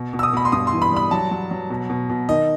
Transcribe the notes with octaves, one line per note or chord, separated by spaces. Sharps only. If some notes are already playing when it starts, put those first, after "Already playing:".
Already playing: B2
B2
E6
D#6
B2 B5
C6
G2 D#6
C6
E3
B5
G3 B5
F#3 A5
F#3
F#3
B2
B2
B2
D#3 D#5